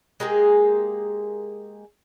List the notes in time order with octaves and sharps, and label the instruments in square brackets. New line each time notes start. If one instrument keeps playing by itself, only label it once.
[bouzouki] G#3 A#3 G4 G#4